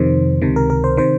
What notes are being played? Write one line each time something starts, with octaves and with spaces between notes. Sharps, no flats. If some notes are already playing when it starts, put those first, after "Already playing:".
Already playing: F2 C3 D#3 C5
C#2 C3 D#3
A#4
A#4
C5
C3 D#3 C5